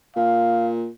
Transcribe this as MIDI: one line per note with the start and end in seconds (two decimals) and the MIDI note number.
0.16 0.88 46
0.16 0.70 77